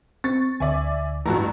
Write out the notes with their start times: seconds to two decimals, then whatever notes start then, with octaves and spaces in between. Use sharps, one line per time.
0.24 C4 C#6 A6
0.60 D2 D3 D5 E5 G#5
1.26 A1 G2 F#4 A5 A#5